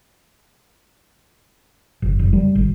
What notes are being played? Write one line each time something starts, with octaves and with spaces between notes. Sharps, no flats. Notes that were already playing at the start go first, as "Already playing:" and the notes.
G1
F#1
G3
G#1